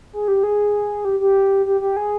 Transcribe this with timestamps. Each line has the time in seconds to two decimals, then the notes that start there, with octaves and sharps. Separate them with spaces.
0.13 G#4
0.28 G4
0.43 G#4
1.05 G4
1.20 G4
1.66 G4
1.81 G4
1.97 G#4